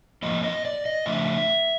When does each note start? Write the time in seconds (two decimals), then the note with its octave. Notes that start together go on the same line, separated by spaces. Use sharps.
0.22 F2 C#3 F3 A#3 D#5
0.43 D#5
0.65 D5
0.86 D#5
1.06 C#3 F3 A3 D4 E5